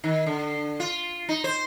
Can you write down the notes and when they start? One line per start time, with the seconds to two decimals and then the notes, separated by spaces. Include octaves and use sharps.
0.04 D#3
0.26 D3
0.80 F4
1.29 D#4
1.44 C5